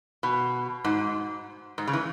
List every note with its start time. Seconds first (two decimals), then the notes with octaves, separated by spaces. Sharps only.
0.23 B2
0.84 G#2
1.78 G#2
1.87 C#3
1.93 E3